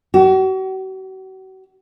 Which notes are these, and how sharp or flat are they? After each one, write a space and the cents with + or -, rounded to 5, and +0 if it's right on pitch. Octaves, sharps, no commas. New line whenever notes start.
F#4 +40